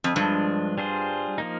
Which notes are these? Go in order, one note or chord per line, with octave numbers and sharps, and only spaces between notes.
F2
G2 F3 G#3 D4
G3 D4 F4 G#4 C5
F3 A#3 D#4